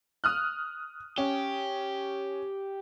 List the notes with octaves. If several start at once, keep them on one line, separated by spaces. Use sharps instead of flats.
D#6 F6 F#6
C#4 G4